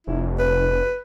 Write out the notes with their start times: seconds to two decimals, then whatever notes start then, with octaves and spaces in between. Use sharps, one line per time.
0.07 F1 E4
0.39 B4